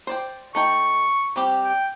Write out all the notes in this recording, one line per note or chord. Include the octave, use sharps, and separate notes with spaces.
C5 D5 G5
A3 D#4 G5 C#6
G3 C4 G4
G5